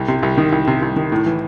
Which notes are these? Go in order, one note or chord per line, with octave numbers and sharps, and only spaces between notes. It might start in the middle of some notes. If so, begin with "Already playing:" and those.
Already playing: C2
C3
C2
D#3
C2
C3
C2
D#3
A2
E3